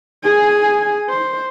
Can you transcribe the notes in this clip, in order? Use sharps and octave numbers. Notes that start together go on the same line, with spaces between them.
G#4 G#5
C5